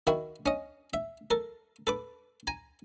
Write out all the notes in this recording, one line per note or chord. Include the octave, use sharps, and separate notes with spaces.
D#3 E4 F#4
C#4 D#5
E5
A4 A#4
A4 B4 D6
G#5 A#5